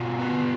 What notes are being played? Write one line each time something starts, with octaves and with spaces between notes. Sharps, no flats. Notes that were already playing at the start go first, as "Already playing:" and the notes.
Already playing: B2 F4
B3